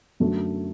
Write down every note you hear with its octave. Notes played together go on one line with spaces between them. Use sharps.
F#2 D3 F#3 A3